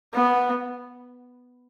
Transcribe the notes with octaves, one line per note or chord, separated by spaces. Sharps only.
B3